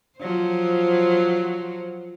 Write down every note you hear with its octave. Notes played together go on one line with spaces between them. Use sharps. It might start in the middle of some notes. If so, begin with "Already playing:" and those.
F3 F#3 C5